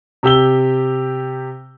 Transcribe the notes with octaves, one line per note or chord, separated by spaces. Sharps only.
C3 G4 E6 G7